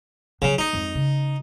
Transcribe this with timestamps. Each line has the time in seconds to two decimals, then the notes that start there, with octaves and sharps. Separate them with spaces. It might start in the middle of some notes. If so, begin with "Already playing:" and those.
0.42 C#3 F3 F#3
0.58 A#3 D#4
0.73 F2 G#2
0.95 C#3